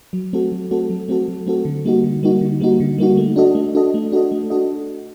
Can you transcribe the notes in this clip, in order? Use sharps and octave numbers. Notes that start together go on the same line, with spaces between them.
F#3
A3 C4 F#4 A4
F#3
A3 C4 F#4 A4
F#3
A3 C4 F#4 A4
F#3
A3 C4 F#4 A4
D3
G3 A#3 D#4 F#4
D3
G3 A#3 D#4 F#4
D3
G3 A#3 D#4 F#4
D3
G3 A#3 D#4 F#4
A3
D4 F#4 A4 D#5
A3
D4 F#4 A4 D#5
A3
D4 F#4 A4 D#5
A3
D4 F#4 A4 D#5